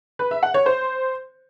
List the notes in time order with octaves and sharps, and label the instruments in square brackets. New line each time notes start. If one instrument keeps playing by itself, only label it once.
[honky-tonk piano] B4
E5
F#5
C#5
C5